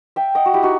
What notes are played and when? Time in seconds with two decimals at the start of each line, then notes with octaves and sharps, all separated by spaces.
0.16 E5 G5
0.35 D#5 F#5
0.46 F#4
0.54 E4 G4
0.63 D#4 F#4